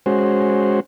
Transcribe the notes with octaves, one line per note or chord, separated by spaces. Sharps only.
G#3 C#4 F#4 C5